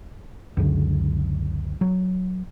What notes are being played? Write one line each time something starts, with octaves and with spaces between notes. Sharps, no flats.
C#2 F#2 D3
F#3